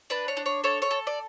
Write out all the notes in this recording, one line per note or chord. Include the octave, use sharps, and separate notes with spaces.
D4 B4
C#5
D4
C#5
A4 C#5
C#5
A4
D5